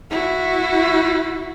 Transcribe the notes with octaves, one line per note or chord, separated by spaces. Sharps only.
E4 F#4